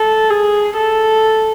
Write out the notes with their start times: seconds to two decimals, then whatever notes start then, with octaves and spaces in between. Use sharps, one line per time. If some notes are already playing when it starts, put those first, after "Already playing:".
Already playing: A4
0.30 G#4
0.77 A4